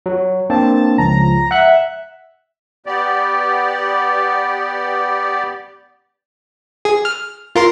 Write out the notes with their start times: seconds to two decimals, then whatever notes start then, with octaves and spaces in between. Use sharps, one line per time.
0.06 F#3 F#4
0.50 A#3 C4 D4 A5
0.98 C#2 F3 A#5
1.51 E5 F#5 F#6
2.86 B3 G4 D5
6.85 G#4
7.05 F6
7.55 F4 A#4 C6